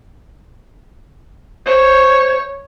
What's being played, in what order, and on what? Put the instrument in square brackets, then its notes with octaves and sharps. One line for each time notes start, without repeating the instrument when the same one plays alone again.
[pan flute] C5 [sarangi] C#5